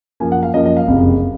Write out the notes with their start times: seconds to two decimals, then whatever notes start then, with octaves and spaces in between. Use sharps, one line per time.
0.20 F#2 F3 A#3 G#5
0.32 F#5
0.43 F5
0.54 F#2 F3 A#3 D#5
0.66 D#5
0.77 F5
0.87 F#1 F2 C3